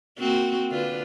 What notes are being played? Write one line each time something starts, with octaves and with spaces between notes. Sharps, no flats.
A#3 C4 F#4
D3 F4 B4